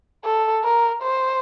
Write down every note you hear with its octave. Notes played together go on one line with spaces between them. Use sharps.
A4
A#4
C5